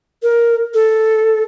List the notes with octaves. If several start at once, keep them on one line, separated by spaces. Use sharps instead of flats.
A#4
A4